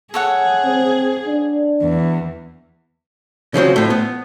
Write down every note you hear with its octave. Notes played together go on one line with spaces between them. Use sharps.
G#4 A4 C#5 F#5
C4
D4
E2
C#3 F3 F#3 C4
A2 F3
B3